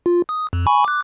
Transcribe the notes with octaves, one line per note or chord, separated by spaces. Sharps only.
F4
D#6
F2
G#5 B5 C#6
D6 F#6